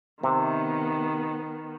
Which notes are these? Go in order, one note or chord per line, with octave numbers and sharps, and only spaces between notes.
C3 D#3 B3